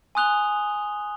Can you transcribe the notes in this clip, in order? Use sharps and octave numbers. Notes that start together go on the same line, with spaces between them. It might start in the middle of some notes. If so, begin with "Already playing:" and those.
G#5 C6 D#6 F#6 F7 G7